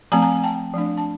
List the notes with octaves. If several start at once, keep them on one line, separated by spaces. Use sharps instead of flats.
F3 A3 C4 G#5 A#5
G#5 A#5
G5 A5
F3 A3 D4
A5